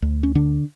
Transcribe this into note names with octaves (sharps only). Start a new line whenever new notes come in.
D2
C#4
D3 D4